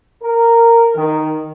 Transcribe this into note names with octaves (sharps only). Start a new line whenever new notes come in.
A#4
D#3